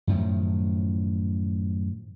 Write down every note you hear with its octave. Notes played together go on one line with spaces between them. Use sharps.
F#2 A2 D#3 F3